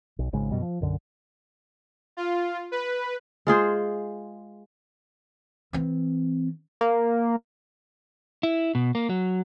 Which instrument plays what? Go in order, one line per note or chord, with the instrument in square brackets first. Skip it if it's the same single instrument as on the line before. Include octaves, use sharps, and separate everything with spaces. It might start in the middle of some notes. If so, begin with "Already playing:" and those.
[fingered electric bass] B1
G#1 G#2 C#3 G#3
F#2 B2 G3
F3
B1 F#2 D3
[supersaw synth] F4
B4
[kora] G#3 F4 G#4 C5
[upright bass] E3 C4
[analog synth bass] A#3
[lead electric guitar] E4
B2
A#3
F#3